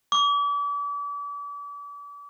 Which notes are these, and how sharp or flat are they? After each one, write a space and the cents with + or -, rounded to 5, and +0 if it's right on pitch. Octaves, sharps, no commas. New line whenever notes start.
D6 -40